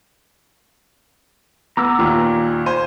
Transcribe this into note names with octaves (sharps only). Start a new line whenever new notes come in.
B3 A#5 D6 E6
D#2 A#2
C5 G#5